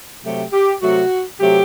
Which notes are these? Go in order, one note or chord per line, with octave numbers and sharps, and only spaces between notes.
C3 F#3 A3 G4
G4
C3 F#3 A3 F#4
C3 F#3 A3 G4